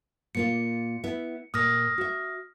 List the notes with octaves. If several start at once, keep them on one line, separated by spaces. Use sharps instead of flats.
A#2 A#3 F4 C#7
B3 E4 E5
A#2 D#6 F6 A#6
F#4 E5